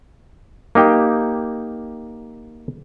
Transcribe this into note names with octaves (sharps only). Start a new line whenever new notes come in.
A#3 D#4 G4 G5